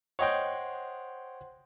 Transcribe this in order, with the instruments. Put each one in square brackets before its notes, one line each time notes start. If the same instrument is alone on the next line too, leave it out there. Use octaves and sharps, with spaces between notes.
[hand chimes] C5 F#5 C6 [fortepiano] C#5 D#5 G5